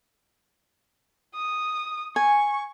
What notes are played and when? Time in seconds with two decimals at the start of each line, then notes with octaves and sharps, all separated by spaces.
1.35 D#6
2.16 G#5 C#6